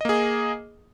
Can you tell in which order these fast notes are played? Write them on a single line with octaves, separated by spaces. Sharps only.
D#5 A#3 G#4